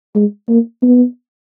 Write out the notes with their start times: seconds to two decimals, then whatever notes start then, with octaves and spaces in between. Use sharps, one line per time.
0.15 G#3
0.49 A#3
0.83 B3